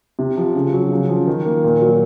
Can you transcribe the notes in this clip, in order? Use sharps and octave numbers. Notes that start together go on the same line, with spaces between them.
C3
F3
C#3
F#3
C#3
F3
D#3
A#3
A#2
F#3